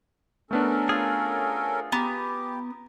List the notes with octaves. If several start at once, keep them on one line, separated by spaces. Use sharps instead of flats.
A3 B3 C#4 D4 A4 A#4
F4 G#4
B3 G4 A#5